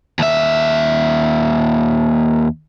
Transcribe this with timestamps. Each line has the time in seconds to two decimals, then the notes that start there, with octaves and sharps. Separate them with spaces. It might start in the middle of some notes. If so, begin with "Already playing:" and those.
0.19 D#2 E5